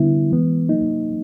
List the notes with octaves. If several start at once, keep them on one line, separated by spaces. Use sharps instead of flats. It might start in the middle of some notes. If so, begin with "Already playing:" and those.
Already playing: D3 G3 B3 E4
E3 G#3 B3
F#3 A#3 D#4